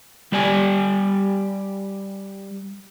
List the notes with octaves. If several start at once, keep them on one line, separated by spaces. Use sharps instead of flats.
G3 G4 D5 G#5